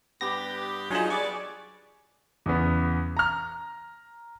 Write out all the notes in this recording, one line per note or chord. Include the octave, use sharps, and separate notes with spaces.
G2 B3 G4 D5 B5 A#6
F#3 D4 D#4 F4 G#4 G#5
G3 B4 D5 C#6
E2 C#3 B3
A#5 F6